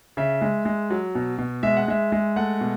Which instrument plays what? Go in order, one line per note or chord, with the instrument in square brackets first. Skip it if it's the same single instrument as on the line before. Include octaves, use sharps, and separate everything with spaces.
[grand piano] C#3 E5
G#3
G#3
F#3
B2
B2
G#3 E5
F#5
G#3 E5
G#3
A3 F#5
B2